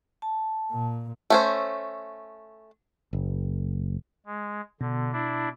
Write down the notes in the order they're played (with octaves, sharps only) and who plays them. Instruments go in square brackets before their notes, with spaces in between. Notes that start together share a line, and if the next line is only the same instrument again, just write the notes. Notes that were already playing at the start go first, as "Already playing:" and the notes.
[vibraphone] A5
[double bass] A#2
[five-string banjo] A3 C#4 C5
[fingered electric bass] F#1
[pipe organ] G#3
[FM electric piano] B2 [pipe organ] D3
[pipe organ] D4 E4